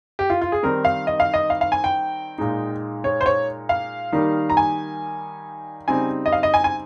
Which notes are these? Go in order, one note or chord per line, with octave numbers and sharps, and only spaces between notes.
G4
F4
F4
G#4
D#3 G3 C4 D#4 A#4
F5
D#5
F5
D#5
F5
F5
G#5
G5
A#2 G#3 D#4
C#5
C5
C#5
F5
D#3 G3 A#3 D#4
A#5
G#5
C#3 G3 C4 D#4 G#5
D#5
F5
D#5
G#5
G#5